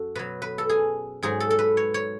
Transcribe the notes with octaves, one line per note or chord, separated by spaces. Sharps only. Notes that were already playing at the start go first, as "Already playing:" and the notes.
Already playing: F#2 F#4 A4
B2 F#3 B4
B4
A4
G#4
G#2 F#3 G#4
A4
A4
B4
C#5
C#5